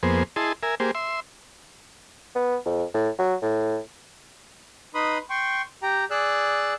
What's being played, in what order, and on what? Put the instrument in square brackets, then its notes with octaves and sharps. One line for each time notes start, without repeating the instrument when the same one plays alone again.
[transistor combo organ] F2 A#3 B3 G#4 C5
E4 G#4 D#5 A5 C6
A#4 E5 G#5
A#3 G4 G#4 C5
E5 C6
[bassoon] B3
F2
A2
F#3
A2
[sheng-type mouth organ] D#4 B4 B5 C6 D#6
G5 C6 C#6
G4 G5 A#5
G#4 D5 E6 F#6